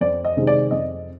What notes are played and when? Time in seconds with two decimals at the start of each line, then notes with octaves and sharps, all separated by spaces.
0.01 F2 D5
0.25 D#5
0.37 C3 D#3 G#3 C4
0.47 D5
0.71 F2 D#5